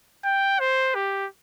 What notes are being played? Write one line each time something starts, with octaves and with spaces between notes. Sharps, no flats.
G5
C5
G4